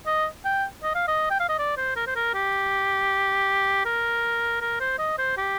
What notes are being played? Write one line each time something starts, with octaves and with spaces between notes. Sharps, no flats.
D#5
G5
D#5
F5
D#5
G5
F5
D#5
D5
C5
A#4
C5
A#4
G4
A#4
A#4
C5
D#5
C5
G4